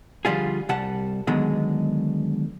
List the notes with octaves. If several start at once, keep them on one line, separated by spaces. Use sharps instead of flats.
D3 F3 G3 F4 G#4
C2 G3 F#5 A5
D3 D#3 F#3 G#3 B3 G#4